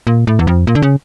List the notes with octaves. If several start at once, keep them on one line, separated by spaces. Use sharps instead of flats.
A#2
A2
E2
F2
A#2
D3
C#3